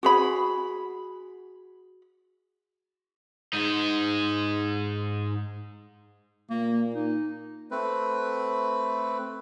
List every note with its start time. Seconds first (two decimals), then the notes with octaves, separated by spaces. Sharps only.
0.03 F#4 G#4 B5
3.53 G#2 D#4
6.51 A#2 A#3
6.94 D#4
7.71 A3 C4 B4